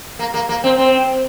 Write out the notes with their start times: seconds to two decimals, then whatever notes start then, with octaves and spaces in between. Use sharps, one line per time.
0.19 A#3
0.34 A#3
0.49 A#3
0.64 C4
0.78 C4